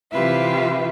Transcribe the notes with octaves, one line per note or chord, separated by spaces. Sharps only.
C3 E3 F4 G4 B4 E5